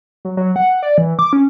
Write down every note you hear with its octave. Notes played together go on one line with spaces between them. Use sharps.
F#3
F#3
F#5
D5
E3
D6
C#4